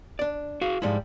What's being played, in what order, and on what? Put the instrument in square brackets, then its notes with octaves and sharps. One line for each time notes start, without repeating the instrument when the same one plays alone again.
[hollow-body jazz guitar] D4 D5
[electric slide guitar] F#4 G#4 [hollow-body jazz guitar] F5
[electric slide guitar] G#2 E4 [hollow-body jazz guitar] F3 G3 G#3